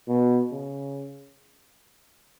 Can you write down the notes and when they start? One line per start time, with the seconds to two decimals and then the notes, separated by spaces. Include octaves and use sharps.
0.08 B2
0.52 C#3